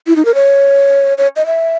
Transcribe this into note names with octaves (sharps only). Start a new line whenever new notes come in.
E4
D#4
A#4
C#5
C#5
D#5
E5